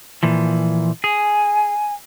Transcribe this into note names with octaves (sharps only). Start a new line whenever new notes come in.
A#2 E3 F3
G#4 G#5